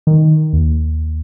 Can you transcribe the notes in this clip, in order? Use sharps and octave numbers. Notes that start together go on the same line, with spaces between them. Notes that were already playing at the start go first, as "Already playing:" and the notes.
D#3
D#2